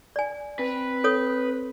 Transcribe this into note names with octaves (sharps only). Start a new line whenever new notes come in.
D5 G#5
C4 B4
A4 C#5 D#6